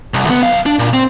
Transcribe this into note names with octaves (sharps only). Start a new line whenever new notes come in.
C2
D2 B3
B1 F5
D4
A#2
C4